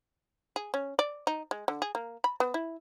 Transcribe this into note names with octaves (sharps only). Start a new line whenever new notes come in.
G#4
C#4
D5
D#4
G#3
D3
G#4
A#3
B5
B3
E4